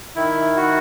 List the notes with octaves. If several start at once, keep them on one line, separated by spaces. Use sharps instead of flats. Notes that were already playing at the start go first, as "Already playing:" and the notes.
D#3 E4
F#4